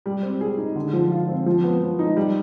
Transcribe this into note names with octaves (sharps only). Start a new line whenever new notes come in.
G3
C4
G#4
D#4
D3
F3
F4
C4
F3
B3
F3
D#4
G3